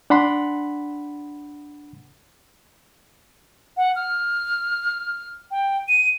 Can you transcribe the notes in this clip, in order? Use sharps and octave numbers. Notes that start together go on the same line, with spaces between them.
D4 F#5 B5 C6
F#5
F6
G5
D#7